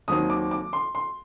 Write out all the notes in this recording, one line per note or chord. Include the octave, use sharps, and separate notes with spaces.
D#2 D#3 F#3 C4 D#6
D6
D6
C6
C6